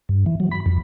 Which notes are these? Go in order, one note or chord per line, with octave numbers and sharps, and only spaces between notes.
G2
E3
F#3
B5
F2